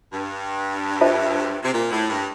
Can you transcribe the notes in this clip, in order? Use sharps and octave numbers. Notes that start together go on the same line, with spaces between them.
G2
D4 F4 C5 E5 A5
C3
A#2
A2
G2